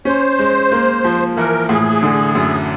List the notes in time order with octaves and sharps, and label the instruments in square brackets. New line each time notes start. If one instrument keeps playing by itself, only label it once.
[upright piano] C#4 [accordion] C5
[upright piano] G#3
A#3
F3
[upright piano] E3 [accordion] A#4
[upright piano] A2 [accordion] G#4
[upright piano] D3
F#2